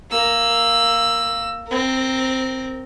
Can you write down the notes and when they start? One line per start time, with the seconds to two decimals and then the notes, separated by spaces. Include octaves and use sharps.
0.11 A#3 E6
1.68 C4 A#4